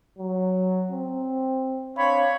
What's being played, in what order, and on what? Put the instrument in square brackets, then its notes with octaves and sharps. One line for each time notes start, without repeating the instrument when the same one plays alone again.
[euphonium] F#3
C4
[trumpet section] C4 D4 C#5 [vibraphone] F5 [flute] B5